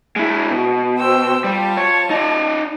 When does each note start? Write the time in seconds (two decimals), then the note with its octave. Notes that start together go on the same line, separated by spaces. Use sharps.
0.16 G#3 E4
0.50 B2
0.98 C5 G5 E6
1.44 G3 F4 A5
1.77 C#5
2.10 D#4 D5